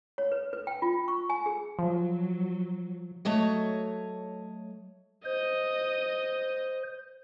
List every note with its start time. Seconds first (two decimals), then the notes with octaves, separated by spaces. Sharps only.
0.18 C#5
0.32 B4
0.53 B4
0.67 G5
0.82 F4
1.08 C#6
1.30 G#5
1.46 G#4
1.79 F3 F#3
3.25 F#3 A3 C#5 D#5
5.25 C5 D#5